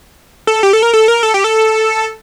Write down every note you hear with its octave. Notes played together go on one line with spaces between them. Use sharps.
A4
G4
A4
A#4
A4
A#4
A4
G4
A4